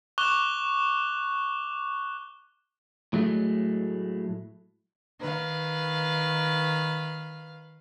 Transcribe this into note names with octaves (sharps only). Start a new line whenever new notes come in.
C#6 D6 F#6 E7 F7 G7
A2 F#3 G#3 A3
D#3 B4 F5